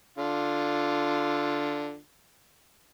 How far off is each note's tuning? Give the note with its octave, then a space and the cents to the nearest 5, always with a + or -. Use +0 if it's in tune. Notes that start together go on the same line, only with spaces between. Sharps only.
D3 +0 F4 +0